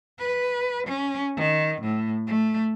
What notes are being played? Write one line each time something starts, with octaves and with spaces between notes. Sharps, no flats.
B4
C#4
D#3
A2
A3